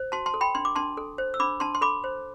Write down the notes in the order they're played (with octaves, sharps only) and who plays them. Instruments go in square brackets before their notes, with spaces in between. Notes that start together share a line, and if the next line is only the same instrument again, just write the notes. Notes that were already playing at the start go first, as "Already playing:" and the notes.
Already playing: [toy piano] C5
F#4 A5 C6
A5 C6
A4
G5 B5
D4 C6
D6
D4 A5 C6
A4
C5
E6
D4 B5 D6
D4 A5 C6
C6
A4 B5 D6
C5